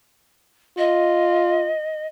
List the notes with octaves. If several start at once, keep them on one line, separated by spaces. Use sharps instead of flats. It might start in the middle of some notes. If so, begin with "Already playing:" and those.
F4 D#5